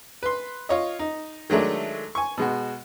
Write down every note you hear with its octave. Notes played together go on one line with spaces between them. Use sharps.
B4 C6
F4 C#5 D#5
D#4
D#3 F#3 G#3 A3 D4
G#5 C#6
B2 G#3 F#4